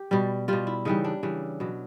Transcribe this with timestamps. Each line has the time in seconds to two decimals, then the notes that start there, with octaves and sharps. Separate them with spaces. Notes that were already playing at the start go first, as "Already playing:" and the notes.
Already playing: G4
0.11 B2 G3
0.48 B2 G3 F4
0.67 E4
0.85 C#3 E3 G3 D#4
1.04 D4
1.23 C#3 E3 G3
1.60 B2 F#3